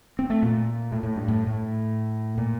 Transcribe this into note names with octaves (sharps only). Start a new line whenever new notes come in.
C4
A3
A#2
A2
A2
G2
A2
A2
A#2